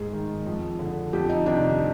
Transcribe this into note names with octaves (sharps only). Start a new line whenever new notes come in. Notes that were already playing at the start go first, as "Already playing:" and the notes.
Already playing: G#2 G#4
D#3
F2
D3
F2 G4
D#4
C3 D#3 D4